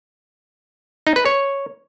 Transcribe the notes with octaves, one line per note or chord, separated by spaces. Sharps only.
D#4
B4
C#5